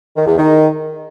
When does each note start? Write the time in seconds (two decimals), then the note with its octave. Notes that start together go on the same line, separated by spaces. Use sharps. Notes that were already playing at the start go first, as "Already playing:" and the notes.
0.16 D#3
0.27 E2
0.37 D#3